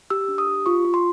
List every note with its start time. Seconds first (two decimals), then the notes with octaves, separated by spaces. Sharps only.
0.10 G4 E6
0.28 D4
0.38 D#6
0.47 G4
0.66 F4 C#6
0.85 F4
0.94 C6